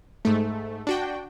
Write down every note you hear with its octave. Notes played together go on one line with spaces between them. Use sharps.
G#2 A3
D4 F#4 G5